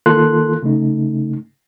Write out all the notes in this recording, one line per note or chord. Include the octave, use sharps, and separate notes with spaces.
D#3 A#3 F4 A4 C6 F#6
C#3 A3 D#4